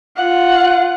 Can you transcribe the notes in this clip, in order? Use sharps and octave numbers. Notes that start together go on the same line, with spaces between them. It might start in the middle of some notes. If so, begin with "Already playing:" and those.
F4 F#5